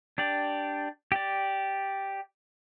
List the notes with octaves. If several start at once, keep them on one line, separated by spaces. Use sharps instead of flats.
D4 G4 D5
G4 D5